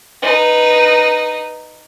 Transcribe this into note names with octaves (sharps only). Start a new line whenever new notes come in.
D#4 B4